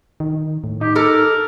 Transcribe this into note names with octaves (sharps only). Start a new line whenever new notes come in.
D#3
A2
D#4 G4
A4 A#4 D6 F6